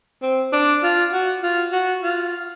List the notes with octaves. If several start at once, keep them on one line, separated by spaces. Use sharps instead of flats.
C4
D4
F4
F#4
F4
F#4
F4